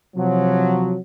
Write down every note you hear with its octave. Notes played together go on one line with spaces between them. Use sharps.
C3 F3 F#3